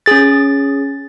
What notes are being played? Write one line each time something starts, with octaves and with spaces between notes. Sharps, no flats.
C#4 G#4 A6